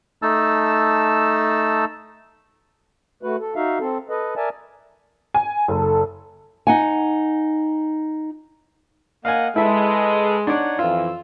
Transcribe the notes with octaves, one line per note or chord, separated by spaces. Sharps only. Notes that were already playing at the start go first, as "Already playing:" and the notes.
A3 D#4 A5 E6
A3 F#4 B4
A4
D#4 F#4 E5 F5
C4 A4
A4 B4 D#5
A#4 D5 E5 G#5 A5
G#5
F#1 A4
D#4 F#5 G#5
A#3 D#5 F5 F#5 G#5
G#3 E4 A4 B4 E5
D4 D#4 C#5 D5 F#5
F2 E3 F4 E6